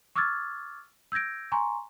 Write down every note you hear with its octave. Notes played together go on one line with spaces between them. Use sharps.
C#6 D6 E6 F6 G#6 A6
E6 G6 G#6 A#6 D7
G#5 A#5 C6 C#6